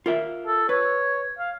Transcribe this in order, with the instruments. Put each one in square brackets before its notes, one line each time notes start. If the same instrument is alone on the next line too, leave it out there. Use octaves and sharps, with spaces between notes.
[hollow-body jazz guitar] F4 A#4 E5
[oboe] A4
[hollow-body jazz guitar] B4 [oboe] C#5
[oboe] F5